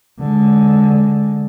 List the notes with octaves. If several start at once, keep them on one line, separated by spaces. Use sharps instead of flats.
D3 G#3